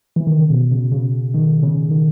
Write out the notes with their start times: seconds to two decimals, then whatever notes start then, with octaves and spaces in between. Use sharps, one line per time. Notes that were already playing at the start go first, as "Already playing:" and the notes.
0.16 E3
0.27 D#3
0.39 C#3
0.50 B2
0.71 C#3
0.92 C#3
1.34 D#3
1.63 C#3
1.91 D#3